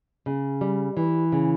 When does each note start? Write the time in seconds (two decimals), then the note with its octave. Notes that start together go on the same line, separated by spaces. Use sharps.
0.26 C#3
0.61 G3
0.97 E3
1.32 C#3